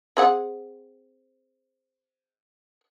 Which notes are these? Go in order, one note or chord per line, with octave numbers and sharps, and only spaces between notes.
C4 G#4 F#5